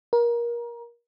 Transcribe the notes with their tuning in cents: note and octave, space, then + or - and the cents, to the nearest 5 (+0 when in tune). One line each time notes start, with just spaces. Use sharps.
A#4 +25